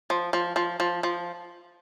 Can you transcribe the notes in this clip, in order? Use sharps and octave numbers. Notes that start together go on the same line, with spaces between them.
F3
F3
F3
F3
F3